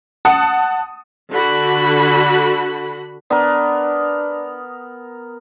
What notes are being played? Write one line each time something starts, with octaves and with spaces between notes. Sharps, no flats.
F#5 A5 D#6 C#7
D3 F#4 B5
B3 D4 A#4